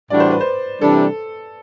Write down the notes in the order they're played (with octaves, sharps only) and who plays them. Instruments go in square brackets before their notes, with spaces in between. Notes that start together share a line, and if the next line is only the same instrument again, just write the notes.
[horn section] A2 E3 G3 D4 F#4 [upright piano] D5
[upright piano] C5
B4
C5
[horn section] C3 E3 G3 D4 [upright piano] A4